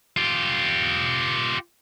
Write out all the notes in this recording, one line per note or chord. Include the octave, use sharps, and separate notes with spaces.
F4 G4